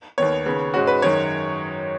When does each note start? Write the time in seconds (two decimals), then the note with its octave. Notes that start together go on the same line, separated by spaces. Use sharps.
0.18 D#2 D#3 B3 C#5
0.46 D#2 C#3 B3
0.74 G#2 G#3 C#4 F#4
0.87 B4
1.02 F#2 D#3 G#3 C#5